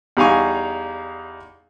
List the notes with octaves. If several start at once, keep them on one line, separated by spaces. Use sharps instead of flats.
E2 G3 D#4 F5 G#5 C#6